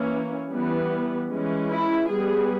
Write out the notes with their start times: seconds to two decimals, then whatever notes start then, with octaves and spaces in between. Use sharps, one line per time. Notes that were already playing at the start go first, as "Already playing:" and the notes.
Already playing: E3 A#3 C#4
0.52 E3 G3 B3
1.31 E3 G#3 C#4
1.71 E4
2.09 G3 B3 G#4